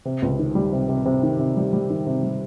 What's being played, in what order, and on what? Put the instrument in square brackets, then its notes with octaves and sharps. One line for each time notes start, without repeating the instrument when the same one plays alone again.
[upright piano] C3
C#2
D#3
G3
C3
C3
C3
D#3
C3
G3
G3
D#3
C3
G3